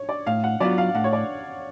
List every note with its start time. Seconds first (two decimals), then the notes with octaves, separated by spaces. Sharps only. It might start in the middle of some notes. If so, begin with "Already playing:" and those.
Already playing: C#5
0.09 D5
0.26 A2 F5
0.44 F#5
0.60 F#3 B3 F4 D5
0.78 F5
0.95 A2 F#5
1.04 C#5
1.13 D5